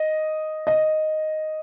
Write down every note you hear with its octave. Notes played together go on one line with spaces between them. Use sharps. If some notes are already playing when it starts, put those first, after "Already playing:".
Already playing: D#5
D#5